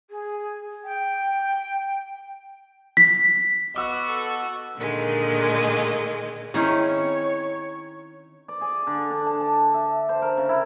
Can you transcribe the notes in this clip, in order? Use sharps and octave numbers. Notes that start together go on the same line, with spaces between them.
G#4
G5
B6
B3 F#4 D#5 D6 E6
A4
A#2 D3 D#3 G#3
D#3 C4 C#4 D#4 E4 G#4 C#5
D5
G#4
D3
D4
A5
A5
E5
C5
A#4
C#3
E4